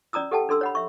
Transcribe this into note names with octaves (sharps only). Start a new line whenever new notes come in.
C#4 D5 A#5 D#6 E6
G4 A4 F#5 G5 A5
D4 A4 C6 E6
C#5 F#5 B5
E5 C#6